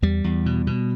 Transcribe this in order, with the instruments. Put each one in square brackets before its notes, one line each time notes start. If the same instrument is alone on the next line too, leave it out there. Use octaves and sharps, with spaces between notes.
[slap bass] E2 G3
E2
B2
B2